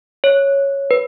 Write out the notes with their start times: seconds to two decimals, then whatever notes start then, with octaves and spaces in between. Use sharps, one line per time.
0.24 C#5
0.91 B4